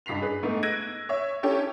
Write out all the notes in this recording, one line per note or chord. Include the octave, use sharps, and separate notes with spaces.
F#1 G2 B6 C7 F7
G#4 B4
G#2 A3 B3
E6 F#6 G#6 A#6 D7 D#7
C#5 E5
C#4 E4 G4 A4 C#5